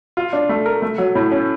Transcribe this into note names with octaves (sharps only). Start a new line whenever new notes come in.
F4
D4
A3
A#4
A3
F#3
A2
C#4